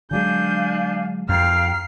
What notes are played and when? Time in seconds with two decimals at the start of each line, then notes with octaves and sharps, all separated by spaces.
0.11 D3 F#3 G#3 D4 F5 G#5 G6
1.29 F2 F5 G5 A#5 F6 C7